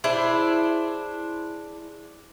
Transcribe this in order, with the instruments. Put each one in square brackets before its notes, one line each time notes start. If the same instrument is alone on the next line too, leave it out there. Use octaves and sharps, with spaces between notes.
[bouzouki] D4 E4 G#4 C5